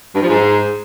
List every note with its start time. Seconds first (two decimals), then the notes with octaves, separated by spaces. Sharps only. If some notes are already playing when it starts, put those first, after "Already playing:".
0.15 G2
0.22 F3
0.28 G#2